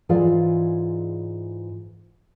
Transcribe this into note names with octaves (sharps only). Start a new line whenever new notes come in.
G#2 E3 F4 G#4 D5 F5